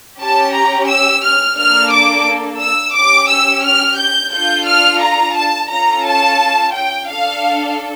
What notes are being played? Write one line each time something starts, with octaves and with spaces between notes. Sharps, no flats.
C#4 G4 A5
A#5
E6
F6
A#3 D4 A4 F6
D6
E6
C#4 G4 D6
E6
F6
G6
D4 F4 A4 G6
F6
A#5
A5
C#4 F4 A4 A#5
A5
G5
D4 A4 F5